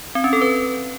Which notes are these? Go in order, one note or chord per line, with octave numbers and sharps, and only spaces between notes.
C4
C#4
A4
B4